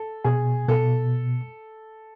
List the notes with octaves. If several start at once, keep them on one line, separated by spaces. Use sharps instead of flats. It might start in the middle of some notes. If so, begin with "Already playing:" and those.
Already playing: A4
B2 G#4
B2 A4